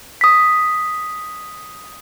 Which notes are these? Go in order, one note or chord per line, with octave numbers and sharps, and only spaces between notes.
D#6 B6